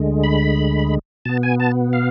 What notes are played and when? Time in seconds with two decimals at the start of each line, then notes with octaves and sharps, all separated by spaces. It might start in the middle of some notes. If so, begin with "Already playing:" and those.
Already playing: D2 D3 G#3
0.24 B5
1.25 B2 B3 A5
1.43 G#5
1.60 A5
1.93 F5